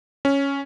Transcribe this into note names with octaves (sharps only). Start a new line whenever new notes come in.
C#4